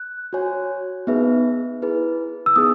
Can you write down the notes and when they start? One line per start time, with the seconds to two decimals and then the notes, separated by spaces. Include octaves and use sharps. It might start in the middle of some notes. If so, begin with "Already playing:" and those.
Already playing: F#6
0.33 F#4 C#5 G#5
1.07 B3 D#4 G#4 B4 E5
1.82 E4 G#4 B4
2.46 E6
2.56 B3 D#4 G#4 D#6